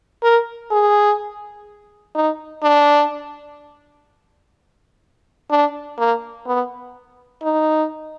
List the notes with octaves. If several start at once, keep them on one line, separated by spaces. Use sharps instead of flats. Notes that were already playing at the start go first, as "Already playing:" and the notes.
A#4
G#4
D#4
D4
D4
A#3
B3
D#4